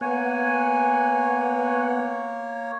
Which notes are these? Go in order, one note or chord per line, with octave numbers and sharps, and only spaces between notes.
A#3 B3 C#5 F#5 G#5